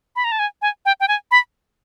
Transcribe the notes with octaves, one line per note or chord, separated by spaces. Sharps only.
B5
A#5
A5
G#5
G#5
G5
G5
G#5
B5